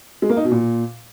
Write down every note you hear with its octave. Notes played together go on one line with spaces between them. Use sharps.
G#3
A#3
D#4
B2
A#2